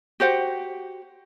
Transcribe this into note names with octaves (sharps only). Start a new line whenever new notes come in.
F#4 G4 C5 F#5